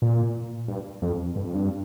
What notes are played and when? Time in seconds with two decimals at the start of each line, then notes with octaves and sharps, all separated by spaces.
0.02 A#2
0.68 G2
1.02 F2
1.36 G2
1.45 F2
1.55 G2